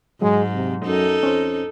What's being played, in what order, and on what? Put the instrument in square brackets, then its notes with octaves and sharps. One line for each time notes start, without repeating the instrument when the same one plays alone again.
[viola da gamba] G#2 [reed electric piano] F#3 [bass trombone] G#3
[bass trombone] C3
[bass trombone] F#2 [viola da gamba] D#4 A4
[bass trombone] F2 [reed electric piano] C#4 C5